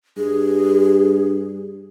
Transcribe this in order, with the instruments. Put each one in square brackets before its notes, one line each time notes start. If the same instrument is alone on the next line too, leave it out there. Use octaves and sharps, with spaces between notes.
[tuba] G2 [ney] G#4